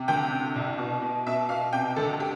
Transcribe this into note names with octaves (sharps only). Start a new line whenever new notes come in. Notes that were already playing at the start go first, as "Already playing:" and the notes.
Already playing: C3
D2 G5
C3
C2
B2
B2
B2 E5
B2 F5
C3 G5
D2 A4
G4